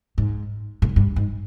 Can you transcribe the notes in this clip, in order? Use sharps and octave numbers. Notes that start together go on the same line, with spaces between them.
G#2
A2
G#2
G2
G#2